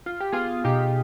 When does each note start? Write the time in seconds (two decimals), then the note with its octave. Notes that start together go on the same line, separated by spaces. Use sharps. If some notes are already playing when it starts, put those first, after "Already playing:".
0.06 F4
0.20 G4
0.32 B3 F4 G#4
0.64 B2 D#4 G4